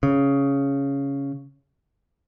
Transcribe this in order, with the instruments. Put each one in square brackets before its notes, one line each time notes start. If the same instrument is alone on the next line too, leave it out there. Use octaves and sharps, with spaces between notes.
[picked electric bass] C#3